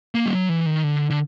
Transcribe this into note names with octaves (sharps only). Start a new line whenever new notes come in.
A#3
G3
F#3
E3
D#3
D3
D3